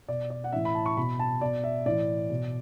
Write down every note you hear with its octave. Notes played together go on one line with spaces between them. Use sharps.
B2 D5
D5
F#5
A2 E3 E5
B5
A5
C#6
B2 B5
A5
B2 D5
E5
A2 E3 D5
B2